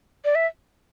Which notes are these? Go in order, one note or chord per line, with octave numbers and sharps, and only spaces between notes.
D5
E5